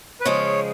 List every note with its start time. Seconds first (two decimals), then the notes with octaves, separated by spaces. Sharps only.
0.21 B4
0.25 C#3 F3 G#3 C#5